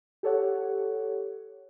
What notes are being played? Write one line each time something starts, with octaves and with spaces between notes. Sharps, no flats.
G4 A4 C#5 F#5